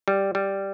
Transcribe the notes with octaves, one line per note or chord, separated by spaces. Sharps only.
G3
G3